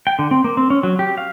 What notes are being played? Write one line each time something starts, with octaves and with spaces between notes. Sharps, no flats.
G5
D3
C4
A#3
C4
C#4
F#3
G4
F5